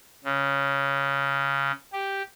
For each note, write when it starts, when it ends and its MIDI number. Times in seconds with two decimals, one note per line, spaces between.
0.24 1.71 49
1.93 2.22 67